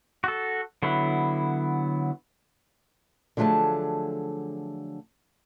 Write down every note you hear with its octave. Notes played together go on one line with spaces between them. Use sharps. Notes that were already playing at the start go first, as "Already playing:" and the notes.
F#4 A4
D3 F#3 B3 E4
D3 F3 F#3 A3 G#4 A5